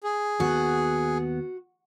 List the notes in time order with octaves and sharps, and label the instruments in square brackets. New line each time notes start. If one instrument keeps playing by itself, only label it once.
[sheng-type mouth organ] G#4
[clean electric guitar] D#2 B3 [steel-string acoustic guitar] F#4